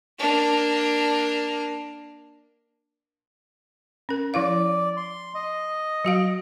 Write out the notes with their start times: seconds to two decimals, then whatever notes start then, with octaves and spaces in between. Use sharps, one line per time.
0.18 A#3 D4
4.09 C#4 A#4
4.34 F3 E4 D5 F5
4.97 C6
5.34 D#5
6.05 F#3 F#4 F5